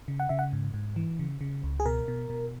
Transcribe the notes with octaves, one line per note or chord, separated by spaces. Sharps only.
C#3
F#5
C#3 E5
F#5
G#2
G#2
E3
C#3
C#3
C#2
G#4
B2 A#4
B2
B2